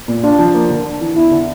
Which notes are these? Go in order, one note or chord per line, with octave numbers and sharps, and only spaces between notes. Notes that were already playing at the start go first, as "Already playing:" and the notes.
A#2
D4 F4
F3
A#3
D3
D4
E3
E2 E4
D3